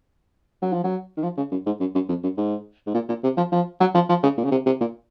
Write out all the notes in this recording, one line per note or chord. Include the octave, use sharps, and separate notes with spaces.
F#3
F3
F#3
D#3
F3
C#3
F#2
G#2
F#2
F#2
F2
F#2
G#2
G#2
A#2
A#2
C3
F3
F3
F#3
F3
F3
C#3
A#2
C#3
C3
C3
A#2